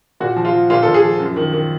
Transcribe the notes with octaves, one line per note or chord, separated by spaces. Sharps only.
A#2 F#4
F3
F4
F3
A#2 F4
A4
A#2
G#4
F3
F#2
D#3
D#3